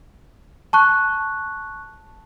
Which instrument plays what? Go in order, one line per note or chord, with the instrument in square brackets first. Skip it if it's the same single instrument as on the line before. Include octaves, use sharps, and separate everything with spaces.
[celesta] A5 C#6 F#6